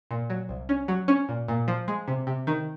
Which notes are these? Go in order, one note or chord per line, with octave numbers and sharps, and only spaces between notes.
A#2
F#3
C2
C#4
F#3
C#4
A#2
A#2
F3
G#3
C3
C3
D#3